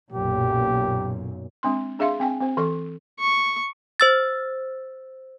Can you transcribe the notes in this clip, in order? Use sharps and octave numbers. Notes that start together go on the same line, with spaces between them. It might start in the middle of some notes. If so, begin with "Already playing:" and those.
B1 F#2 A#2 G4
G#3 C4 D4 C6
D4 G#4 E5 F5 C6
C4 G5 G#5
C4 C5
E3 A4 C#6
C#6
C5 E6 A6